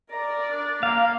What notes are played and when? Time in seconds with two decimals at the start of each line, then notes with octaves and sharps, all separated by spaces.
0.11 A#4 D5 A#5
0.50 D4
0.83 A#3 F5